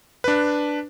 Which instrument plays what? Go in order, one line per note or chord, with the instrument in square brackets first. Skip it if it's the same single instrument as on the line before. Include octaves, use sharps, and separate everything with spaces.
[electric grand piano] D4 B4